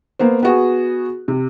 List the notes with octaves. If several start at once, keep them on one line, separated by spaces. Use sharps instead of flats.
A#3 B3 C5
B3 F#4 G#4
C3